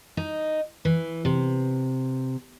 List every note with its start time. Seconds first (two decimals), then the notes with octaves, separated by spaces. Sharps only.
0.17 D#4
0.85 E3
1.25 C3